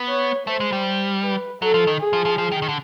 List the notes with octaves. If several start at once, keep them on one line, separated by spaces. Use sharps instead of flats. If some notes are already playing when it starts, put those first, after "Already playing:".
Already playing: B3
C#5
A3 C5
G#3
G3
B4
F#3 A4
F3
D#3
G#4
F3
F3
F3
D#3
D#3
D3